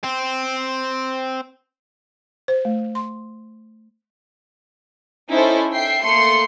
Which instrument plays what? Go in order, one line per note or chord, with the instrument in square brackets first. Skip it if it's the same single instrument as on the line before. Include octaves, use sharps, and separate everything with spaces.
[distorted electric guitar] C4
[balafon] C5
A3
C6
[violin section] C#4 D#4 E4 A4 C5
E5 G5 C7
A3 A#3 C6 C7 C#7